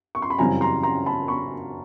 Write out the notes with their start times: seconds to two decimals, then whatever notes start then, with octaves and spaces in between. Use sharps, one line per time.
0.15 C#6
0.22 C6
0.30 B5
0.38 F#2 C#3 E3 G3 C4 G#5 A#5
0.61 A#5 C6
0.83 A#5 C6
1.06 A5 B5
1.28 B5 C#6